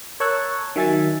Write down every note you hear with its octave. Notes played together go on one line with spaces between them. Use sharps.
A#4 C#5 A5 C#6 E6 F#6
D#3 F#3 E5 G#5 G#6 A6